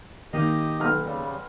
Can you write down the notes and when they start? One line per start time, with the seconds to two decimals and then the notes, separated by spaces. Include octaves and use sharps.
0.33 D#3 A#3 D#4 G4 D#5
0.80 B1 F6
1.05 C#3 G3